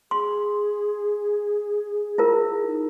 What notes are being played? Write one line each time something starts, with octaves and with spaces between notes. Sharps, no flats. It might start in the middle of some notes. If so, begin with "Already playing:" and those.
G#4 C6
E4 F4 A#4
D#4